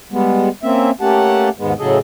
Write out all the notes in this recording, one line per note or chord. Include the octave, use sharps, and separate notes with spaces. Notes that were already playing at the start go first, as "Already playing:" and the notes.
G3 G#3 B3
A#3 C4 C#4 E5
A3 A#3 C#4 G4 F#5 A5
D#2 G#2 G#3 B3
A2 C#3 F#3 G#4 A4 D#5